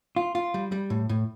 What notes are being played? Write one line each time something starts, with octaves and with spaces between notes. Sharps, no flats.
F4
F4
G3
G3
A2
A2